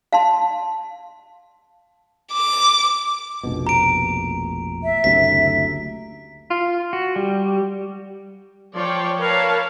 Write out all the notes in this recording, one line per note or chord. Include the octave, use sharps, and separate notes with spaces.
F5 A5 C6
D6
F1 A#1 B2
A#5 D7
E5
F#1 D2 C3 B6
F4
F#4
G3
F3 C#5 D5 G5
A#4 B4 C#5 F5 A5